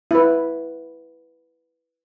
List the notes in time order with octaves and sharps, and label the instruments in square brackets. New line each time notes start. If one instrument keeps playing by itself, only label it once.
[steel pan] E4 B4